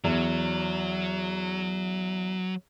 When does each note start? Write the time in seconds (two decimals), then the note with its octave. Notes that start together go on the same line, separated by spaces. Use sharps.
0.04 E2 F#3